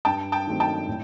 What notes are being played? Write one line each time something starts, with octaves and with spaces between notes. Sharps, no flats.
G2 G5 A5
G5 A5
D#3 F#3 A3 C4
G5 A5
A2